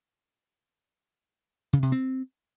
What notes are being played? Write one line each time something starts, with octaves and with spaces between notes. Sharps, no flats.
C#3
C3
C4